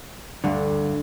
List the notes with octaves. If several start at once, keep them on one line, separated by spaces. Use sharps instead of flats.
D2 G2 D3